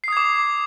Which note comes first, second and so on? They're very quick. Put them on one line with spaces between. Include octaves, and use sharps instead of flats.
C7 D#6 G#6 D6